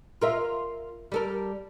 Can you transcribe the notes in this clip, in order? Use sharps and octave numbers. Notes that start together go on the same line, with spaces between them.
F4 A#4 E5
G3 A4 A#4